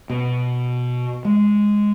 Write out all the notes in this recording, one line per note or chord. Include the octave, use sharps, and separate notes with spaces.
B2
G#3